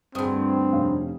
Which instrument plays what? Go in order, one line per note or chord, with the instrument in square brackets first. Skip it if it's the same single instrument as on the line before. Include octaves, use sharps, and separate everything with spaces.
[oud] D2 G2 [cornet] C4 [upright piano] G#4 D#6
[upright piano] F1 C#4 F5